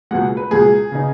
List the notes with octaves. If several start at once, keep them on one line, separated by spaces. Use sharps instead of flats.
C#2 B2 G#3 F#5
B4
C#2 B2 G#3 G#4
C#3 B3 D#4